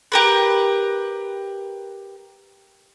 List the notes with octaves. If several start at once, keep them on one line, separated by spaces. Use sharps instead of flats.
G4 A#4 B4